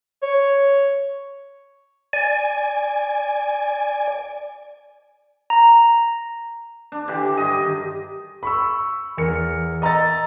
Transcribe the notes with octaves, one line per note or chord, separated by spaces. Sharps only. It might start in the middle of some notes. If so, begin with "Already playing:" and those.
C#5
D5 G#5
A#5
D4
D3 E3 G4
G4
G2 D#5
D#3
B5 C#6 E6
E2 A#4 C#7
D#5 A#5 E6 A6